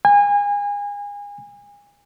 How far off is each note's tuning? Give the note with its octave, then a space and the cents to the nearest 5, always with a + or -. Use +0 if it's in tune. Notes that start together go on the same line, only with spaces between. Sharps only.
G#5 -30